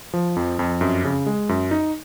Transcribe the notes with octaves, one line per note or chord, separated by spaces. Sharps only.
F3
F2
F2
F#2
C#3
G#3
F#2
D#4